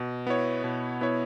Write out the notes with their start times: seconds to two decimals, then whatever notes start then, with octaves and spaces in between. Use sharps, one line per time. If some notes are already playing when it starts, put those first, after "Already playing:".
Already playing: B2
0.27 B3 E4 C#5
0.64 B2
1.01 B3 E4 C#5